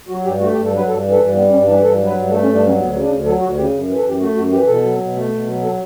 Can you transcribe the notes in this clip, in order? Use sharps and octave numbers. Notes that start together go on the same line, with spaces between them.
F#3 F#4
G2 G4
A3 F#4
G4
G2
A4
F#3 B4
G2 A4
E3
A4
G2
G3 B3
G2 C#4
E3 D4
G2 A4
F#3
B4
G2
A3 A4
C#4
G2
D4
F#3 C#4
D2 B3
C#3
D4
D2
F#3 A4
D2 F#4
C#3 G4
F#2
E3
A4
F#2 G4
A3 F#4
F#2 F#4
E3 G4
B2 A4
F#3
B2
A3
B2
F#3
A4